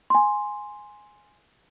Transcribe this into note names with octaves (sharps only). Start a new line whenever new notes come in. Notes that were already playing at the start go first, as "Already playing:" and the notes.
G#5 C6